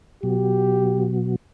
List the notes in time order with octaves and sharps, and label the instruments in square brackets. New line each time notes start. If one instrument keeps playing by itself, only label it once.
[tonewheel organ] B2 F#3 [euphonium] G4